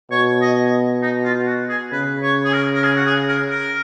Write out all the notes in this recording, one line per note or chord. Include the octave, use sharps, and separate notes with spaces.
B2 C#5
D#5
D#4
F4
F#4
G#4
C#3 B4
C#5
G#4
A#4
A#4
G#4
F#4
G#4
A#4
A#4